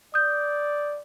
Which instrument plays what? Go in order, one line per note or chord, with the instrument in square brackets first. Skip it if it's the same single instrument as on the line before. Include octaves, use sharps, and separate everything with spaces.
[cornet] D5 [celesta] D#6 G6